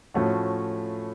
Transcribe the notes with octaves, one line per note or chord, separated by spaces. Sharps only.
A2 F3 A3 C#4 F#4